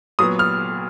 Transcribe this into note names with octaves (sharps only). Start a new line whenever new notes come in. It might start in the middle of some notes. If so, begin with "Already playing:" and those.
A#2 F#3 B3 D#6
F6